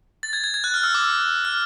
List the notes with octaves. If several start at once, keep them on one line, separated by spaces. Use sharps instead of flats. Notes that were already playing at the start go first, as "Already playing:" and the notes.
A6
G#6
G#6
G#6
F#6
F6
E6
D6
E6
F6